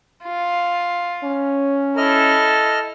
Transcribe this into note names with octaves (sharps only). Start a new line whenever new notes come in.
F4
C#4
E4 A4 D#5 F6